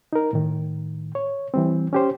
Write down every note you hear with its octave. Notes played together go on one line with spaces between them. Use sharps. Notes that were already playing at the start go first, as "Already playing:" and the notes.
D#4 A#4
A2 D#3
C#5
E3 G3 C4
C#4 G4 C5